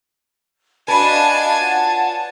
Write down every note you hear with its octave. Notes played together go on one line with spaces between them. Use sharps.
D4 F#4 B4 D#5 F5 G#5 A5
F4 C#5 F#5